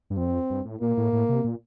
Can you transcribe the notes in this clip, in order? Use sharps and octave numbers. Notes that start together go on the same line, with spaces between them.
G2
F2 C4
G2
A2
A#2 A#3
A2
A2
C3
A#2